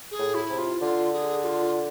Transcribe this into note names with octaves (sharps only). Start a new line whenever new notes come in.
G#4
A2
E4
C3
F4
D3 F4
G#4
G#4
F4